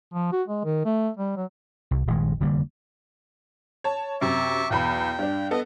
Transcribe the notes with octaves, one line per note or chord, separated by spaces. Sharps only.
F3
F#4
G#3
D#3
A3
G3
F#3
C2
D#1 A#1 D#3 G#3
F1 D3 G3 A#3
C#5 A5
F#2 C3 E5 C#6 D6
B1 E2 G5 B5
G2 D4
B3 A4 D#5